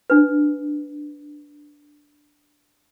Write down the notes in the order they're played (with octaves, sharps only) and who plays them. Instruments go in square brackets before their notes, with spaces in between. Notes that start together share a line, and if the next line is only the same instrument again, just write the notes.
[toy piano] D4 B4